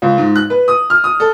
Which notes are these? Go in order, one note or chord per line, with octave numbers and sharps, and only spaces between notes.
C#2
G#2
F#6
B4
D#6
F6
D#6
A4